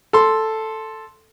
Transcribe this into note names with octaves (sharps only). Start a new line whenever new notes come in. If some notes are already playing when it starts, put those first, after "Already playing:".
A4 C6